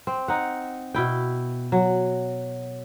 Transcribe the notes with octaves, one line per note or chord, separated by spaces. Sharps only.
C4
D#4 F#5
B2 E4 G5
F#3